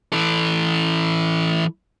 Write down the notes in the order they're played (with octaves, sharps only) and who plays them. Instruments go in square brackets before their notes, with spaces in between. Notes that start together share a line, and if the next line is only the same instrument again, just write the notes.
[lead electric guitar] E3 A4